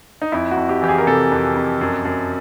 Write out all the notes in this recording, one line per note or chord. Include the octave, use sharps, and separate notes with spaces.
D#4
F2 E4
F#4
F2
G4
E3 G4
G#4
A#4
C3 A4
F2
F2
F#2
F#2